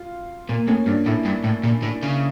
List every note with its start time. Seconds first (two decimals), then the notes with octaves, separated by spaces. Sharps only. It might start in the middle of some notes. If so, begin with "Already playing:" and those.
Already playing: F4
0.49 A#2 A#3
0.68 A2 C#4
0.87 G2 D4
1.06 A2 E4
1.25 G2
1.44 A2
1.63 A#2
1.82 A2
2.02 C#3